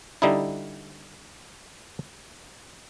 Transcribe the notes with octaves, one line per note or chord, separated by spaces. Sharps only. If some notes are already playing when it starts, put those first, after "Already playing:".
D3 G3 D#4 E4